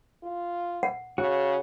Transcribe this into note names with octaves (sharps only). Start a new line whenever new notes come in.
F4
F#5
C#3 F#4